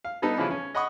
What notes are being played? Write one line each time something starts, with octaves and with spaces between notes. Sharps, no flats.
F5
G3 B3 D#4 A4
C#3 E3 F3 C#4 E4 B4
C#4
D#5 F#5 B5 C#6 D#6